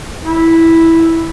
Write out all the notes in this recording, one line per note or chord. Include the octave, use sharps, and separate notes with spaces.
E4